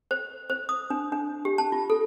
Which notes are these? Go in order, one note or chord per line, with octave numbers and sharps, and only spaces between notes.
C5
C5
D#6
D4
D4
G4
A5
F4
A4